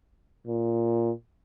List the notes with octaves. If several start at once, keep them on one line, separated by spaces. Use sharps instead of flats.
A#2